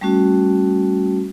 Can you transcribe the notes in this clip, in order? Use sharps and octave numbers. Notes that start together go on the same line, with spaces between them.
G3 A3 C#4 F#4